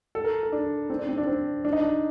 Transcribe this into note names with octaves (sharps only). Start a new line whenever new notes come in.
A4
A#4
A#4
D4
C4
D4
C4
D4
C4
D4
D#4
D4